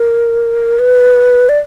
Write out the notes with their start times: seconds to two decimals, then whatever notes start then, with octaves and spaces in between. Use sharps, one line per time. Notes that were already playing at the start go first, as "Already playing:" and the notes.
Already playing: A#4
0.79 B4
1.49 D5